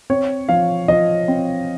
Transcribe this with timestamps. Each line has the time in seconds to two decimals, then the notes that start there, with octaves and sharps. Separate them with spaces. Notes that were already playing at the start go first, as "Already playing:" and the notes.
0.10 C4 C#5
0.49 F3 F5
0.88 F3 D#5
1.28 C4